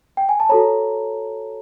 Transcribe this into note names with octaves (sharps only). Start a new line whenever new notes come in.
G5
G#5
A5
F#4 A4 C#5 A#5